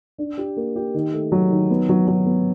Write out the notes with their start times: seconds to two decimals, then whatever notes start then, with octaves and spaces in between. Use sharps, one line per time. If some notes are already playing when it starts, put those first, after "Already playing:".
0.18 D4
0.38 G4
0.56 A#3
0.76 G4
0.94 D#3
1.13 A3
1.32 F#3
1.51 D#3
1.70 B3
1.89 F#3
2.08 F#3
2.26 B3